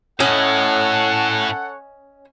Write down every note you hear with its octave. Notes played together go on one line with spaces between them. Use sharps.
A2 C#4 A4 C#5 D#5 F#5